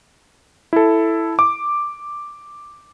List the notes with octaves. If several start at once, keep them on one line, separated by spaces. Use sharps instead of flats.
E4 A4
D6